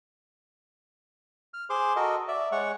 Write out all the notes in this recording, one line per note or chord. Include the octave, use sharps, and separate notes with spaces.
F6
G#4 C5 C6 D6
F#4 A4 A#4 D#5
D5 E5
G#3 C#5 F#5 C#6